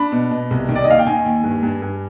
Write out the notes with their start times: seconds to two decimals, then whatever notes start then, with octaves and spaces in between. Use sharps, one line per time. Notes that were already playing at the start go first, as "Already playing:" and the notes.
Already playing: D4 B5
0.12 B2
0.31 B2
0.51 C2
0.69 D#3
0.75 D5
0.84 D#5
0.88 D#2 F5
0.99 G5
1.07 D#3 G#5
1.25 D#2
1.44 G2
1.63 G2
1.82 G2